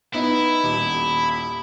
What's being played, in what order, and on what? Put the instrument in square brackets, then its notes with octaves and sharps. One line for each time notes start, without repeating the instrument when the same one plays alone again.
[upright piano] B3 D#4 [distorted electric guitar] E4
[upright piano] D#1